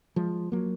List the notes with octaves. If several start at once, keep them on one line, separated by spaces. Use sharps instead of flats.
F3 G#3
F#3 A#3